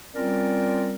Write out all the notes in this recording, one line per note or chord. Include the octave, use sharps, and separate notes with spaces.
G3 C4 C#4 F4 A#4 D5